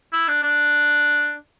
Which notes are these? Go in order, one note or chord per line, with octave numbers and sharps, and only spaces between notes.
E4
D4
D4